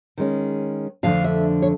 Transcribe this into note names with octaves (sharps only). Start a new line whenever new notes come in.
D#3 G#3 C#4
F2 D3 F3 A3 D4 F5
E5
C#5